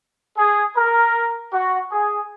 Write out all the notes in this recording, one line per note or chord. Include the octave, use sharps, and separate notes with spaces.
G#4
A#4
F#4
G#4